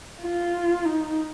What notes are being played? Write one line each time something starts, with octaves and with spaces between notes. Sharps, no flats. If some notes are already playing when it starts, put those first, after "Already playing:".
F4
D#4